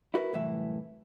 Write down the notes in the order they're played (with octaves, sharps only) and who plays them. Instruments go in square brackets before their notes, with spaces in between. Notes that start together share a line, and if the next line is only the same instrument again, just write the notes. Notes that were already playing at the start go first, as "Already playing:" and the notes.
[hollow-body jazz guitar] E4 F#4 A#4 B4
C2 F#2 A2 E3 E4 E5